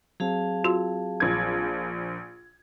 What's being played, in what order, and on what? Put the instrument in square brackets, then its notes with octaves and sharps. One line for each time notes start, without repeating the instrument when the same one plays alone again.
[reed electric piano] F#3 C4 [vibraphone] G#4 F5 A5
[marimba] F4 F#4 C6
[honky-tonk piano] A#1 G#6